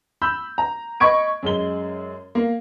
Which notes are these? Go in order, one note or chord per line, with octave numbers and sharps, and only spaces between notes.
B5 E6 G6
A#5
D#5 B5 C#6 G#6 D7
F#2 G#3 G7
A#3